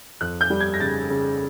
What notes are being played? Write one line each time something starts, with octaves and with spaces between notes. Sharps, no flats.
F2 F#6
G6
G3
G#6
A#6
C#3 A6
C#3